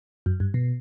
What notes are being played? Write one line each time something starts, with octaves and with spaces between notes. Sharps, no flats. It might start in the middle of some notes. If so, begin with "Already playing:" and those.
F#2
G2
B2